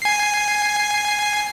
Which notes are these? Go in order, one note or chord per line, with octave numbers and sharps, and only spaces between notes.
G#5 C7